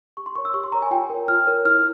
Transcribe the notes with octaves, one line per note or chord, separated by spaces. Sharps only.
G4 C#6
C6
A#4 C#5 C#6
E6
G4 C#6
C6
A#4 C#5 A#5
G#5
F4 G5
A#4 C#5
F4 F6
A#4 C#5
E4 F6